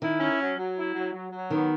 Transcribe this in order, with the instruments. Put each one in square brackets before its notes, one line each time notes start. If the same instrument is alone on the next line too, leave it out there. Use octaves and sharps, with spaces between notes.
[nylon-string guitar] D#3 [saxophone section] E4
[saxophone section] C#4
F#3
F#3
E4
F#3
F#3
F#3
[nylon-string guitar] D#3 [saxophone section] B3